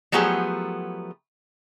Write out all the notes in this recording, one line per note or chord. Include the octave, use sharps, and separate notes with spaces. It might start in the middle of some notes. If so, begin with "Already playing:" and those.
F3 F#3 A3 B3 G4 G#4